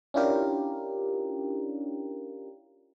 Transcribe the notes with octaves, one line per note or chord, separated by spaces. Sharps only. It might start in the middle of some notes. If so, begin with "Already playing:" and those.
C#4 D4 E4 F4 G4 A#4